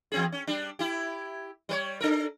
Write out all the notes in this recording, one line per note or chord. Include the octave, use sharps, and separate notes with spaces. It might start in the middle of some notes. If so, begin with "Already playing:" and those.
E2 C4 G#4
C#4
G3 D4
E4 G4
G3 B4 C#5
D4 A4 A#4